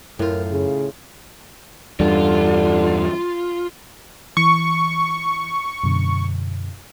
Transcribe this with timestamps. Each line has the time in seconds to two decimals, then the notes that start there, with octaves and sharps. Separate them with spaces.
0.19 F#2 A2 F4 A#4
0.51 C#3 G#4
2.00 E2 G2 D3 G3 F4
4.37 E3 C#6
5.84 F#2 B2 D3